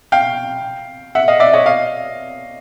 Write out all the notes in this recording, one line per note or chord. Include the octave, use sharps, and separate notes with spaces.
F5 G5
E5 F#5
D#5 F5
D5 E5
C#5 D#5
D#5 F5